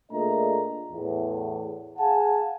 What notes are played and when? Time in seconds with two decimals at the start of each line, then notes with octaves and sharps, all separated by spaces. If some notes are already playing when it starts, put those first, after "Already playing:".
0.12 A#2 A3 D4 G#4 D#5 A#5
0.92 E2 A2
1.98 G#4 F5 F#5 G#5 A5